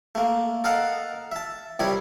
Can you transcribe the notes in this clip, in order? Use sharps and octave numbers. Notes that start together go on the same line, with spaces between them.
A3 A#3
A4 A#4 D#5 F5 F#5 A5
E5 A5
C2 C3 G3 E4 C#5